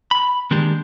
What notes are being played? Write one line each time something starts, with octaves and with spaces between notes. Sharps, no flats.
B5
D#3 G#3 A#3 D4 G4